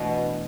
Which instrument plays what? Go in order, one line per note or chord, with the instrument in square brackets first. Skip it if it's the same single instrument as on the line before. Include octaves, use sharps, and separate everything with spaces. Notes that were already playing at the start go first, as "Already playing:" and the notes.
Already playing: [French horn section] B2 [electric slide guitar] E3 A3 D4